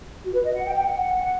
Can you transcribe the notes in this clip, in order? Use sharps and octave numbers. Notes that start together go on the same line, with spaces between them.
F#4
B4
D#5
F#5
G5
G5
F#5
F#5